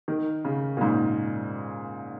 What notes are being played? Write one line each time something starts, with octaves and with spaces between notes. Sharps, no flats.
D#3
C#3
A#2
G#2